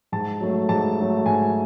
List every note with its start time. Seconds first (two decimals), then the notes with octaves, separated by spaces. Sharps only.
0.12 G#2 A5
0.40 F#3 A3
0.69 G#2 A5
0.98 F#3 A3
1.26 G#2 G#5